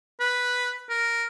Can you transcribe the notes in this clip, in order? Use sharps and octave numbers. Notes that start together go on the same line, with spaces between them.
B4
A#4